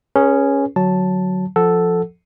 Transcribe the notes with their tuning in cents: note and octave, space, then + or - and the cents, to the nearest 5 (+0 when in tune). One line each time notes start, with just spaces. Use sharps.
C#4 +0 G#4 +0 B4 -35
D3 +20 F#3 +0 A5 +0
F3 +0 A4 +0 F#5 +0